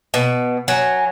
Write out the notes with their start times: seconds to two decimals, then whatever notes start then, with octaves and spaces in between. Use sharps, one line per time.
0.14 B2
0.68 F#3 G#5